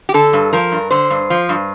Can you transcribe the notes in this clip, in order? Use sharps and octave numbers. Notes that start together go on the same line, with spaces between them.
G4
D3 A4
G2
F3 A#4
G2
D3 C5
G2
F3
G2